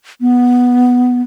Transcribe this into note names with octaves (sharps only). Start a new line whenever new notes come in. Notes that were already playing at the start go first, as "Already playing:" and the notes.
B3